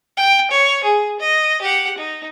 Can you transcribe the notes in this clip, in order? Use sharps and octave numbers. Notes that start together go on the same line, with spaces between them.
G5
C#5
G#4
D#5
G4 F#5
D#4